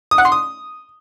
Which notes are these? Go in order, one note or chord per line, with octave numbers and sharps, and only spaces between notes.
D#6
F#5
C6
D#6